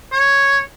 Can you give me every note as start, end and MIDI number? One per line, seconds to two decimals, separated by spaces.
0.12 0.59 73